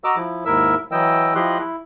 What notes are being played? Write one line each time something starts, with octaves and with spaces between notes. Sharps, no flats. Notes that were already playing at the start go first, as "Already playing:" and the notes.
F#4 D#5 A#5 D6 E6
F3 E4
D#2 G#2 E4 A#4 E5 E6
E3 F#3 E4 D#5 G5 E6
F3 E4 G4 D#5 C6 F#6
E4